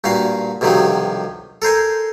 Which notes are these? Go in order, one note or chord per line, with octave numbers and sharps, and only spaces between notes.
G2 A#2 F#4 F5
B1 G2 C3 D#3 F3 F#3
A4 A#4 C5 G#5